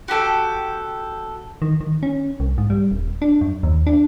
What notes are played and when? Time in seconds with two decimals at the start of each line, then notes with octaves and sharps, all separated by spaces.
0.08 F#4 G4 A4 G5
1.62 D#3
1.81 D#3
2.03 C#4
2.40 C2
2.58 G#2
2.70 G3
2.91 D#1
3.22 D4
3.41 F#2
3.63 D#2
3.87 D4